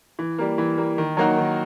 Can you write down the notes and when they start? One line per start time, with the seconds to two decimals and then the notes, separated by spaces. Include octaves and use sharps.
0.19 E3
0.39 G3 A#3
0.58 E3
0.78 G3 A#3
0.98 D#3
1.17 F#3 A#3 D#4 F#4
1.37 D#3